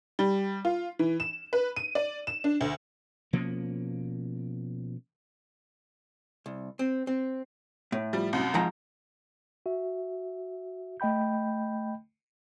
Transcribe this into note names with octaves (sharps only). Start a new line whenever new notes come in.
G3
F4
E3
E7
B4
D#7
D5
E7
D4
D2
B2 F3 A#3 C#4
C2
C4
C4
A2
F3 G3
C2 F#2
G#2 F3 A#5
F#4 E5
A3 D#5 G5 B5 G6